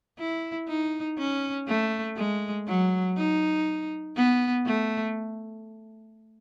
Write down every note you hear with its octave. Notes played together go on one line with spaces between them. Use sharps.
E4
D#4
C#4
A3
G#3
F#3
D#4
B3
A3